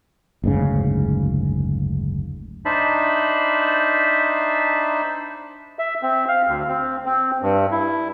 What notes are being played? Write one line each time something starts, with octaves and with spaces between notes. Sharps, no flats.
F#1 D2 G#2 C#3
D4 D#4 C5 E5 A5 B5
E5
C4
F5
D2
C4
C4
G2
E4